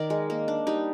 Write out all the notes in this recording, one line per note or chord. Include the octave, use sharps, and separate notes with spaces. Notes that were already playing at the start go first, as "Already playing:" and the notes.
Already playing: D#3 A#4 D5
G#3
A#3
D4
G3 D#4